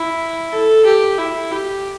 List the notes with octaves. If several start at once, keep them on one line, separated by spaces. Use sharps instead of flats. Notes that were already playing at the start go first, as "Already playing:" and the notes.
Already playing: E4
A4
G4
E4
G4